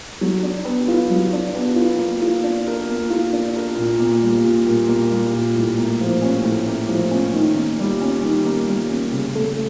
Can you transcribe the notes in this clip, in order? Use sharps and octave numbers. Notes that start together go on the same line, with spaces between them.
F#3
D4
B3
F4
F#3
D4
B3
F4
A#3
F4
D4
A#4
A#3
F4
D4
A#4
A#2
A#3
G3
A#2
A#2
A#3
G3
A#2
A2
A#3
F3
C#4
A2
A#3
F3
C#4
D#3
A#3
G3
C#4
D#3
A#3
G3
C#4
C#3
A3